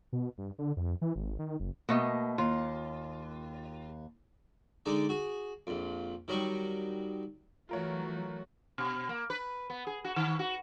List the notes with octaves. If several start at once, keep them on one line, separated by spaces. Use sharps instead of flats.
B2
G2
D3
F2
E3
G#1
D#3
F#1
B2 A3 A#3 D#5
D#2 F4
D3 G#3 D#4 D5
F#4 G#4
A#1 F2
D#3 F#3 G3 D#5 C#6
E3 F#3 A3 F4 F#4 A#4 C#5
B2
A#3
B4
B3
G#4
F#4
D#3
F#4